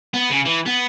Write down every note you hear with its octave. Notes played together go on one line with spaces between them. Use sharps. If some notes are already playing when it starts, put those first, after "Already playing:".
B3
C#3
E3
B3